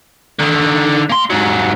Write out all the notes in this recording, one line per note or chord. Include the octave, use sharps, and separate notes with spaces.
D3 D#3
A#3 C6
G#2 F#3